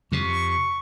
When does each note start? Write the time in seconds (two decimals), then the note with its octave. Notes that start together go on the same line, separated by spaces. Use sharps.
0.12 F2 C3 C#6